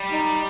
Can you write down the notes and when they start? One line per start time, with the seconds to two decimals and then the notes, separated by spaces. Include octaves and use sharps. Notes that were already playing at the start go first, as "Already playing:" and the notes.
Already playing: G3
0.12 D#4